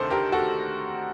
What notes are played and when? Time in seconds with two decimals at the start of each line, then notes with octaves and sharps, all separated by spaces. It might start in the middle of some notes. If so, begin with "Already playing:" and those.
Already playing: D2 C3 D#3 A3 D4 A4 C5
0.10 G4 A#4
0.32 F#4 A4